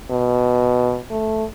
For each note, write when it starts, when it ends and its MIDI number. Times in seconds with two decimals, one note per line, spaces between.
0.10 0.99 47
1.11 1.45 57